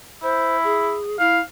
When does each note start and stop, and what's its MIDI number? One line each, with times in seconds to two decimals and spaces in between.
0.22 0.95 64
0.22 0.57 72
0.63 1.16 68
1.19 1.40 64
1.19 1.41 77